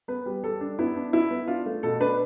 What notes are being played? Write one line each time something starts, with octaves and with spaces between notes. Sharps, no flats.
B3 B4
G3
G3 A4
D4
B3 E4
D4
B3 E4
B3
D4 F4
A3
B2 A4
D4 B4